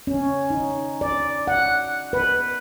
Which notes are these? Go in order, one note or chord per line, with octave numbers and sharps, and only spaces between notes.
C#4
D#4
D5
F#5
B4